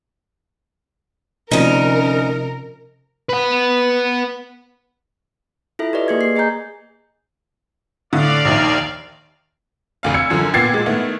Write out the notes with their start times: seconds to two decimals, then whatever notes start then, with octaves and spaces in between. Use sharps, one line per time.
1.51 D2 C3 F3 C#4 D#4 A#4
3.30 B4 F#5
5.79 E4 F4 A4 E5
5.93 G4 B4 D5 D#5
6.08 A#3 G#4 G#6
6.21 C7
6.36 G#4 D#5 G#5 A#5 G6
8.13 A2 D3 D5 F5
8.45 A#1 D#2 D#3
10.03 F1 D2 F5
10.14 E6 G#6 C#7
10.30 F#2 D3 F3
10.54 A#2 B3 G5 G#6 A6 C7
10.74 A#2 G#3
10.86 D#3 A3 B3 E4